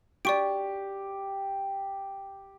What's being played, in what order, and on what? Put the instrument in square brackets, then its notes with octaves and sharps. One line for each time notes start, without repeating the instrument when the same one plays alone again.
[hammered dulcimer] G4 [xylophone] D5 C#6 D7